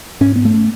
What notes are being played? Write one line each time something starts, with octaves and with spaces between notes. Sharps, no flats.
G#2 C#4
B3
A3